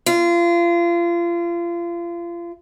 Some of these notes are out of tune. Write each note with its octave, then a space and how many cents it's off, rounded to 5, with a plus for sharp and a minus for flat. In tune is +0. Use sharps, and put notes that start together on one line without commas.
F4 -30